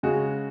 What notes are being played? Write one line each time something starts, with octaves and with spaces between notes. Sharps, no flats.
C#3 G#3 F#4